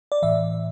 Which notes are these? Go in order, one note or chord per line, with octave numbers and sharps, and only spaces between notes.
D5
A2 E3 E5